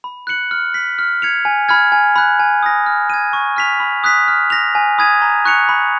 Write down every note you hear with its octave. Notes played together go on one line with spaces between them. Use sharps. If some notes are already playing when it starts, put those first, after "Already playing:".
B5
F#6 C#7 F#7
F6
B6 F#7
F6
G#6 C#7 F7
G#5
B5 F6 G#6
G#5
B5 F#6
G#5
D#6 A#6
F6
G#6 D#7
C#6
F6 B6 F7
B5
D#6 F#6 B6
F6
A#6 F7
G#5
B5 D#6 G#6 D#7
A#5
C#6 F#6 C#7 F7
B5